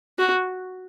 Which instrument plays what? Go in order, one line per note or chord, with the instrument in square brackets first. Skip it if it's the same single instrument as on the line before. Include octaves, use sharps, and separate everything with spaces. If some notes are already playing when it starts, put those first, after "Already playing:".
[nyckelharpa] F#4